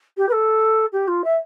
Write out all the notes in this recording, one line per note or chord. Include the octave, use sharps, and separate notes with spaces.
G4
B4
A4
G4
F4
E5